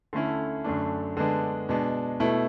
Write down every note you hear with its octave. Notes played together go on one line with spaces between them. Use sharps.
D3 A3 C#4 E4
F#2 D3 A3 D4
D3 G#3 B3 D4
B2 G#3 D4
B2 A3 E4